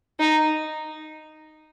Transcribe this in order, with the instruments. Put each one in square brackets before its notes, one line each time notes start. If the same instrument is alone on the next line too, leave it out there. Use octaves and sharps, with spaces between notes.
[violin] D#4